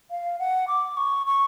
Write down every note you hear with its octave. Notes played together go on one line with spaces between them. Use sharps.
F5
F#5
D6
C#6
C#6